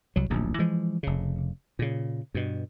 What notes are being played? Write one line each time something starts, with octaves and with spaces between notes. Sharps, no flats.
C2 F#3
D1 A#1 D#2
E3 F3 G#3
F1 C#3
A#2 C#3
G2 B2